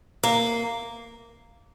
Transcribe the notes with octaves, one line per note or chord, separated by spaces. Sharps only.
A#3